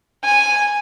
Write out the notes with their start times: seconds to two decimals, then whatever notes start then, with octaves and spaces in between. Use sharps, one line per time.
0.25 G#5